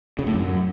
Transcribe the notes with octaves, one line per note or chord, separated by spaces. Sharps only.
C#3
A2
F#2